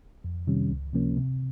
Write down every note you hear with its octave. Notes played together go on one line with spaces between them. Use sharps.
F2
C3 D#3 G3 C#4
C#2
C3 F3 A#3 C#4
C3